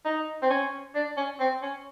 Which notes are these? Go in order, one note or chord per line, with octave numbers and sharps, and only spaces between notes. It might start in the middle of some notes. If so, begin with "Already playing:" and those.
D#4
C4
C#4
D4
C#4
C4
C#4